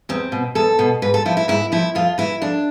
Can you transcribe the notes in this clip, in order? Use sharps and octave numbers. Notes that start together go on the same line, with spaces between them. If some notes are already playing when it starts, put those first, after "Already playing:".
E2 C4
B2
E2 A4
B2
G#2 B4
A4
F3 E4
E4
G#2 E4
F3 E4
F2 F4
E3 E4
F2 D4